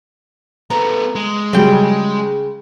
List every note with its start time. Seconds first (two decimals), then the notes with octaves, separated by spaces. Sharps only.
0.70 A3 B3 A#5
1.15 G#3
1.53 C#3 F#3 G3 G5